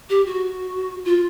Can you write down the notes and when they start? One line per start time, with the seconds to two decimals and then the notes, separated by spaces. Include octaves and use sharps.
0.10 G4
0.26 F#4
1.05 F4